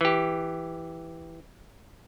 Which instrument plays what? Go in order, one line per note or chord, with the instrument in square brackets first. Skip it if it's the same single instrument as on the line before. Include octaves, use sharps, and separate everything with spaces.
[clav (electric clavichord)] E3 G4